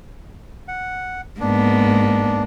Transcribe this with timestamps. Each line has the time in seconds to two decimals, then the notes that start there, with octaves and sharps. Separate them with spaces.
0.68 F#5
1.41 G#2 A#3 B3 D4